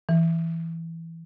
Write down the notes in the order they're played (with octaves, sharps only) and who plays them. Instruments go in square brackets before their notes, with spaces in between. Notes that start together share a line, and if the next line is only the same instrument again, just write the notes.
[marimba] E3